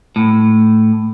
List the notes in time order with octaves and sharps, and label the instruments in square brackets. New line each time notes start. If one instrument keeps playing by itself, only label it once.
[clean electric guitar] A2